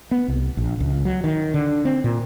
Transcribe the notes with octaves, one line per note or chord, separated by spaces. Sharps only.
B3
C2
A#1
C#2
F#3
D#3
D3
C4
A#2